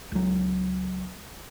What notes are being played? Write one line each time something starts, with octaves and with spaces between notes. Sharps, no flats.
C#2 F#3